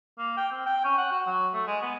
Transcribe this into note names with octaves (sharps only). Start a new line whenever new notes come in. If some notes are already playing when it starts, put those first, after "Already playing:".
A#3
G5
C4
G5
C#4
F#5
F#4
F#3
A3
G#3
B3